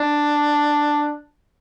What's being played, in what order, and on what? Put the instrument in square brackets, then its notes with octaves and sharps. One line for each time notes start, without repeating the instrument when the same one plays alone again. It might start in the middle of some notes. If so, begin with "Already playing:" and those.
Already playing: [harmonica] D4